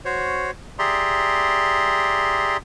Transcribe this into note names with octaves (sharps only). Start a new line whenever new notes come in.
F#4 C5 C#5
G4 G#4 D5 E5 A#5 C6